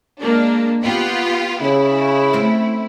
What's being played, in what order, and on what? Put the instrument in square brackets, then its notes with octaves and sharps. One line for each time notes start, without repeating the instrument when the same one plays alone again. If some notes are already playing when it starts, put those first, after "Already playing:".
[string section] G#3 A#3 D4
B3 F4 G4
[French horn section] C#3 [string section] E4
[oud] A3 C4 C#4